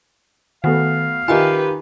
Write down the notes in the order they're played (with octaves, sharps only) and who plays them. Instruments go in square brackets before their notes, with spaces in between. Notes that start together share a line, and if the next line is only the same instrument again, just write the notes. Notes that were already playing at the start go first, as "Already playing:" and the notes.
[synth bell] D#3 [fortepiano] A3 B3 F#4 [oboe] F5
[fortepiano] D#3 F4 [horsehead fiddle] G4 B4 [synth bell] D#5 E5 G#5